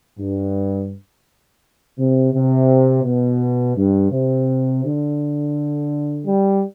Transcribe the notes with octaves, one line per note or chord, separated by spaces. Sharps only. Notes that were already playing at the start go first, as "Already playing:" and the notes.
G2
C3
C3
B2
G2
C3
D3
G3